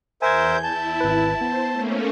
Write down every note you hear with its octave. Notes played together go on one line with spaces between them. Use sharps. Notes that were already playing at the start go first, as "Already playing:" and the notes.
E2 A#4 C5 E5 G#5 G6 G#6
E4 A5
G#1 B4
B3 C5
A3 A#3 C#4